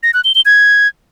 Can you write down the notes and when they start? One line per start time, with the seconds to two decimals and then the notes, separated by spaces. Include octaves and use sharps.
0.03 A#6
0.14 F#6
0.24 G7
0.35 G7
0.45 G#6